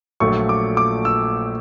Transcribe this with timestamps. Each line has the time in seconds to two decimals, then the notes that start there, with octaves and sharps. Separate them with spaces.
0.20 A#1 A#2 F#3 A3 C#6
0.49 D6
0.77 D6
1.05 E6